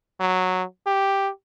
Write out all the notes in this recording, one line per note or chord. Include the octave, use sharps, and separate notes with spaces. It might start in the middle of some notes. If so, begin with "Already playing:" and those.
F#3
G4